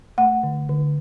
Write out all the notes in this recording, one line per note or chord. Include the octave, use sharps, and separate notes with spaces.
A3 F#5
D3
D3